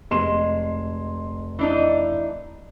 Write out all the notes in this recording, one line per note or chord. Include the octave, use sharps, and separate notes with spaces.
F1 G#3 C6 E7
E3 D4 D#4